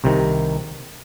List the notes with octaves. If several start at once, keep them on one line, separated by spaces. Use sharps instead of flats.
C2 C3 D#3